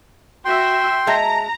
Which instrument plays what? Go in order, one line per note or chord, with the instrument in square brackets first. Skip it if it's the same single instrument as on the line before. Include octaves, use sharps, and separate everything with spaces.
[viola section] F#4 E5 [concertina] G5 C6
[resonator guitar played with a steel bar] G#3 E5 A5 [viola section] A#5